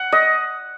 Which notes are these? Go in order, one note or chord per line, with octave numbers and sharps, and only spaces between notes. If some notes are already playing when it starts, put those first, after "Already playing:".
Already playing: F#5
D#5